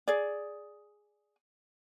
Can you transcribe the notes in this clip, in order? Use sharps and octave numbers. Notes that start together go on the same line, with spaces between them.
G#4 D5